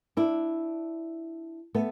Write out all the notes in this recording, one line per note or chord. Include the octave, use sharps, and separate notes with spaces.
D4 E4
A3 B3